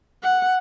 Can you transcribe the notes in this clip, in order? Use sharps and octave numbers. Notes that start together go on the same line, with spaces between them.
F#5